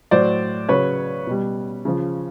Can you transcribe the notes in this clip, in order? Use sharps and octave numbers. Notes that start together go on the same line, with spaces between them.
A2 F#3 C5 D5
C#3 F#3 B4 C#5
B2 G3
C#3 F3